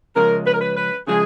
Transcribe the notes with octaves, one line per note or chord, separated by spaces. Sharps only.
C#3 F3 G#3 C#4 A#4
B4
A#4
B4
B4
C#3 F3 G#3 G#4